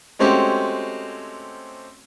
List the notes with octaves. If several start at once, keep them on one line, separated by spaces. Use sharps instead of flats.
G#3 A3 C4 C#4 F#4 G4